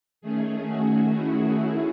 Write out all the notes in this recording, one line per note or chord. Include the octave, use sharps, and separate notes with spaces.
D#3 A3 C#4 G#4
F#4
E4
E4